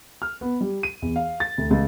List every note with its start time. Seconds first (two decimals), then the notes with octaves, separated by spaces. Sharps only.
0.22 F6
0.41 B3
0.61 G3
0.83 D#7
1.02 E2
1.16 F5
1.40 A6
1.58 D2
1.71 C#2